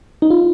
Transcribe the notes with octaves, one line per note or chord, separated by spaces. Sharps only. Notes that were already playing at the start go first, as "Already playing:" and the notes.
D#4
F4